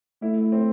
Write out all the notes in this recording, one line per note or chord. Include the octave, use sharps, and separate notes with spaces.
A3 E4
C4